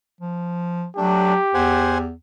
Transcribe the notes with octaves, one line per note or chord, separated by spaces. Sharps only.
F3
F#3 A3 D4 G4
E2 C5 F#5 G#5